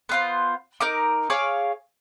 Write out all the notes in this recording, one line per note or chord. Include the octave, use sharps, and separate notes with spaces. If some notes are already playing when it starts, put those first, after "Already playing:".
B3 F4 C5
D#4 A#4 D6
G#4 C#5 F5 D6